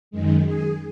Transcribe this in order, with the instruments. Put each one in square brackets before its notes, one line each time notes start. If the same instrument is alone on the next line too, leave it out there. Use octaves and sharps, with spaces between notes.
[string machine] F#2 D#3 G#3
G#4